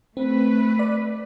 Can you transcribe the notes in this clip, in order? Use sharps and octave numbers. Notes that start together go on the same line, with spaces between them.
A3 C4 B4
D5